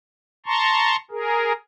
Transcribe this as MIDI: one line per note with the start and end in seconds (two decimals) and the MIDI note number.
0.46 0.96 81
0.46 0.96 82
0.46 0.96 84
0.46 0.96 85
1.11 1.52 68
1.11 1.52 70